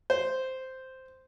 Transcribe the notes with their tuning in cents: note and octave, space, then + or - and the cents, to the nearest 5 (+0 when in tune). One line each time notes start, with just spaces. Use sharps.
C5 -5